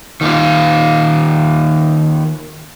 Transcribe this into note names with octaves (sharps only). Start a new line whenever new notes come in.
D#3 A#3 F4